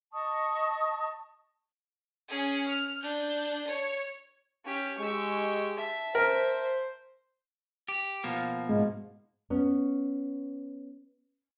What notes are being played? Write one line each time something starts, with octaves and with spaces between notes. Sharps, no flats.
D#5 A5 C#6 D#6
C#4 G#4
F6
D4 G6
C#5
C#4 G4
G#3 G4 C#6 E6
E5 A5
A#4 C5
G4
B2 F3 A#3
G#2
B3 C#4